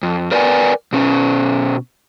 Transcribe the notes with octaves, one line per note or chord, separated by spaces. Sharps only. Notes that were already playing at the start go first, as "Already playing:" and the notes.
F2
A#4 B4 D5 D#5 G5 G#5
B2 C#4